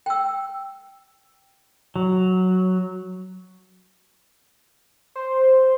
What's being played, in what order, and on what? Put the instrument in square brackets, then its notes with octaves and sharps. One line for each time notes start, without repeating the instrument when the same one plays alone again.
[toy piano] G5 E6
[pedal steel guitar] F#3
[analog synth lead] C5